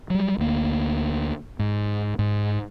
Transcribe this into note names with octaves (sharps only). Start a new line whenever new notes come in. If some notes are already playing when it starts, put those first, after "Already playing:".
F#3 G3
D2 A#3
G#2
G#2